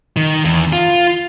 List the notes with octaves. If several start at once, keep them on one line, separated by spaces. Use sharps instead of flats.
D#3
E2
F4